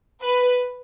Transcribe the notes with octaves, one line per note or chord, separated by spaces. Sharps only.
B4